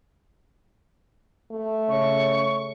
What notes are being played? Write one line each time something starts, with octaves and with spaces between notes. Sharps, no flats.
A3
C#3 C#5 C#6